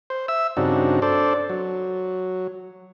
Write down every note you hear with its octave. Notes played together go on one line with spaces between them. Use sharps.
C5
E5 E6
G2 C#3 C4 D4 D#4 F#4
D4 A4 C5 D5
F#3